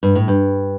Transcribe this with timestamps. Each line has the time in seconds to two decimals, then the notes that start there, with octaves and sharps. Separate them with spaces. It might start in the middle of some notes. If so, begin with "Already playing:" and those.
0.03 G2
0.15 A2
0.28 G2